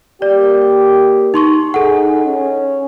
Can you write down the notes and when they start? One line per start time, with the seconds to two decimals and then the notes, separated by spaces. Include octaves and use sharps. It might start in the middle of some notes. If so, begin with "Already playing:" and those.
0.22 A#3 G4 D5
1.34 D#4 C6 C#6
1.74 D#4 G#4 A4 F#5
2.25 C#4